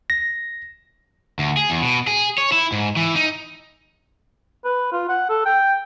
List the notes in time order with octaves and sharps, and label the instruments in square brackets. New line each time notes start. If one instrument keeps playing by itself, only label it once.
[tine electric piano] A#6
[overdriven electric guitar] D2
G#4
E2
B2
G#4
C#5
E4
G#2
E3
D#4
[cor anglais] B4
F4
F#5
A4
G5